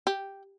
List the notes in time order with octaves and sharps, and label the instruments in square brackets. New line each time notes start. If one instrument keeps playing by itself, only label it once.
[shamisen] G4